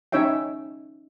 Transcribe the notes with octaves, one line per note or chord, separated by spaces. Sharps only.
C#4 D#4 C#5 E5 G5